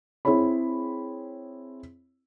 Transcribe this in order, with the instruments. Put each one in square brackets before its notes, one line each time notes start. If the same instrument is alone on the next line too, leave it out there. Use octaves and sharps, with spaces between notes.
[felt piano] C4 E4 G#4 C#5 B5